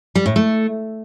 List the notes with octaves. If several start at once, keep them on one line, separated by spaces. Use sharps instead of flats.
G3
A2
A3